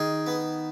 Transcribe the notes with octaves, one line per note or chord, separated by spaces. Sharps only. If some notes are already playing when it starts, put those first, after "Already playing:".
Already playing: D#3 G#4
B3